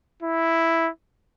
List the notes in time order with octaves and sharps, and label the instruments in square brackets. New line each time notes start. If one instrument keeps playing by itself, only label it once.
[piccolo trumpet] E4